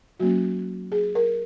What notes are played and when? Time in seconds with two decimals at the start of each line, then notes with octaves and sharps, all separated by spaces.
0.20 F#3 A#3 C#4 F#4
0.92 G#4
1.15 A#4